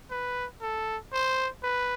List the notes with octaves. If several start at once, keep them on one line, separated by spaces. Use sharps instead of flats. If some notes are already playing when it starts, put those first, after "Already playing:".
B4
A4
C5
B4